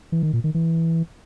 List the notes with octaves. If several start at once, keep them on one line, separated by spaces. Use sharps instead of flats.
E3
D#3
A#2
D#3
E3